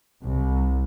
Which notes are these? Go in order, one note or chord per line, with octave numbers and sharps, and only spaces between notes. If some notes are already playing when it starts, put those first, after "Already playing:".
C2